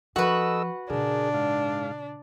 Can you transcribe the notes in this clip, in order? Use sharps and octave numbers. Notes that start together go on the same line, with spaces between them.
F3 F#4 A4 B4 D#5 E6
A#2 C#3 D4 G#4 A#4
G#2 F5